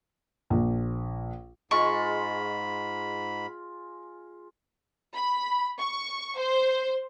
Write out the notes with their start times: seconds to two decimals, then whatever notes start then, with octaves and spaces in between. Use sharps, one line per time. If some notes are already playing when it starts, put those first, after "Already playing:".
0.50 A#1
1.71 G#2 G#3 F4 B5 C#6
5.15 B5
5.80 C#6
6.38 C5